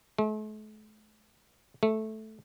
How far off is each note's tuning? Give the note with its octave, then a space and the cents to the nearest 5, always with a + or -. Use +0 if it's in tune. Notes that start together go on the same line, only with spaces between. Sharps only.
A3 -45
A3 -10